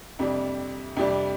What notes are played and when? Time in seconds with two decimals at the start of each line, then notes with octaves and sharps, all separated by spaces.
0.19 F2 C3 G3 D4
0.97 F2 C3 G3 D4